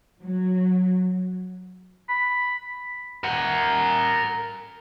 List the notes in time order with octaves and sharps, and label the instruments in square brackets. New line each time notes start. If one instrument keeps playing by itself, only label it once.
[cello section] F#3
[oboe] B5
[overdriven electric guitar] A#4 F#5